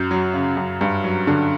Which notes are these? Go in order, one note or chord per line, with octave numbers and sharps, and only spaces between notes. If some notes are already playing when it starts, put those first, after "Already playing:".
Already playing: F#2 G6
F#3
C#3
F#2
G2
F#3
D3